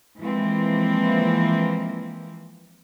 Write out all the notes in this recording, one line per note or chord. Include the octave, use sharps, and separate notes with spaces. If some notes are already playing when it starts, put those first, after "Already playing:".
E3 F3 G#3 A#3 C4